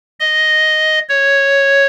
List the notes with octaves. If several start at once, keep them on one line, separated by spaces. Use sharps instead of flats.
D#5
C#5